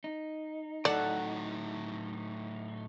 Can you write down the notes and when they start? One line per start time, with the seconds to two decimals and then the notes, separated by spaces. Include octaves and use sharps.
0.04 D#4
0.85 A2 F#3 A4 D5 F#5